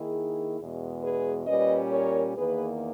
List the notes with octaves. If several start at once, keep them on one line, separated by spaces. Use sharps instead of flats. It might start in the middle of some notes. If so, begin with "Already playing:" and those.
Already playing: D#3 A#3 D#4 E4 G#4
E2 B2 G#3
G#4 B4
A#2 G3 C#4 B4 D#5
A#4 C#5
E2 D#3 A#3 G#4 B4